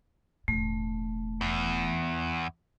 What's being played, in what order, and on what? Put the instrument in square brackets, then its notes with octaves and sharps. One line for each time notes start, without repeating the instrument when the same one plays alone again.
[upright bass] E1 A2 [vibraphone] A3
[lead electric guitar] E2